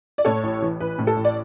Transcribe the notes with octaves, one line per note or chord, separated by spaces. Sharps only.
D5
A2 A4 C#5
A1
E3
A1 B4
A2
A4
A1
D5